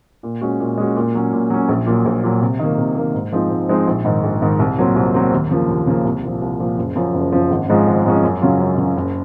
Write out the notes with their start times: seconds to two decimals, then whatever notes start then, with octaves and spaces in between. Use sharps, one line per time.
0.23 A#2
0.41 G#3 C#4 F#4
0.60 A#2
0.78 G#3 C#4 F#4
0.96 A#2
1.15 F#3 C#4
1.33 A#2
1.50 F#3 C#4
1.69 A#1
1.86 A#2 F#3
2.05 A#1
2.23 A#2 F#3
2.41 C3
2.59 D#3 A#3
2.78 C3
2.96 D#3 A#3
3.14 G#2
3.32 F3 G#3 C4 D#4
3.50 G#2
3.69 F3 G#3 C4 D#4
3.87 A#1
4.05 G#2 D#3
4.24 A#1
4.42 G#2 D#3
4.59 C2
4.78 A#2 F#3 C4
4.96 C2
5.14 A#2 F#3 C4
5.32 D#2
5.51 C#3 F3 A#3
5.69 D#2
5.87 C#3 F3 A#3
6.05 C2
6.23 A#2 F3
6.42 C2
6.60 A#2 F3
6.78 F#1
6.95 F#2 F3
7.15 F#1
7.32 F#2 F3
7.50 G#1
7.69 G#2 F3 G#3 C#4
7.87 G#1
8.06 G#2 F3 G#3 C#4
8.23 F#2
8.41 C#3 F#3 C#4 F4
8.60 F#2
8.77 C#3 F#3 C#4 F4
8.97 F#1